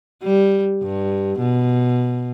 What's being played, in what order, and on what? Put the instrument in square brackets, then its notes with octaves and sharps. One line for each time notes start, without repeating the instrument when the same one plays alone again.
[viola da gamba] G3
G2
B2